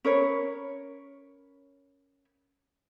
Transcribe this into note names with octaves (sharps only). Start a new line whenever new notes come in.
C#4 A#4 B4 C#5